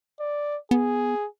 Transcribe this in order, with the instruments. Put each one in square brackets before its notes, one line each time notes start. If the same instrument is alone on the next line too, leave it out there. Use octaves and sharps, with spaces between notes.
[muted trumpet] D5
[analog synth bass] B3 [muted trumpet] G#4